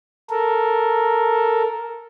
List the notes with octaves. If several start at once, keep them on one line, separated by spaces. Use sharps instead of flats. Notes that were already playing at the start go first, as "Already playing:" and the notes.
A4 A#4